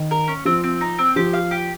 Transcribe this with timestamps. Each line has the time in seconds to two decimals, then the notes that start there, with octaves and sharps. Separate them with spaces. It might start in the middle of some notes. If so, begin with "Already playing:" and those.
Already playing: D#3
0.11 A#4
0.28 C#4
0.45 F3 C4
0.64 C4
0.81 D#4
0.99 C4
1.16 F3 G4
1.33 F5
1.51 G4